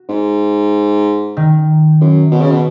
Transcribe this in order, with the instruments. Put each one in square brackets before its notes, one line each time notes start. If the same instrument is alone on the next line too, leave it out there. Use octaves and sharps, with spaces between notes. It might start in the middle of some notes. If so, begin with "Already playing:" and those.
Already playing: [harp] F#4
[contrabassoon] G#2
[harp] D#3
[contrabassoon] F#2
B2
C#3
B2